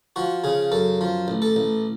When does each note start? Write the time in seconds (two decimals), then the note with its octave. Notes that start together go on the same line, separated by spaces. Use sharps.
0.16 F3 F#4
0.44 C#3 G#4
0.72 F#2 A4
1.01 F3
1.28 A1
1.42 A4
1.56 A1